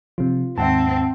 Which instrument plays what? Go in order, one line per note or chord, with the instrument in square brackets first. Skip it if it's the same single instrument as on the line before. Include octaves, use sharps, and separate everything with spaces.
[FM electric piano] C3 F3 [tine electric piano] F4
[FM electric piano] D#2 G#2 [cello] C4 [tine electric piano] E5 F#5 A5